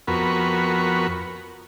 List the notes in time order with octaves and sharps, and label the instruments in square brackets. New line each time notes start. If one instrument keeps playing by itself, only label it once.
[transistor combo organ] F2 B3 F#4 A#4 B5 C#6